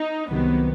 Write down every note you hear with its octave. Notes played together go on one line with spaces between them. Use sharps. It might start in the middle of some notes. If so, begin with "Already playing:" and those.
Already playing: D#4
C2 C3 D#3 F#3 B3